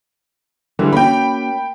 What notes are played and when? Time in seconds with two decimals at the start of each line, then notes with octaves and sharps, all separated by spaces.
0.79 D3 E3 G3 G#3 D4
0.93 A#3 C#4 F#4 G5 B5